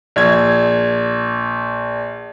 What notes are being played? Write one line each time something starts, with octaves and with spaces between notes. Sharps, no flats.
A#1 G#6